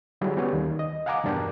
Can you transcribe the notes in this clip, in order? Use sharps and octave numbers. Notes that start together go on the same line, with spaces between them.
D3 F#3 G3 E4 G#4
G3 B3 C#4 C#5
D#2 D#3
D#5
F5 F#5 G#5 A#5 D6
E2 G2 B2 D4 A#4 G5